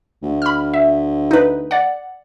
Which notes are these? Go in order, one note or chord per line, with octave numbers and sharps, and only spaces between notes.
D2
B5 F6
E5
D#4 B4
D5 F#5